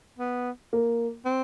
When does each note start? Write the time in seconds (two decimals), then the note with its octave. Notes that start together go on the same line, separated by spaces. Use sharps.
0.19 B3
0.73 A#3
1.25 C4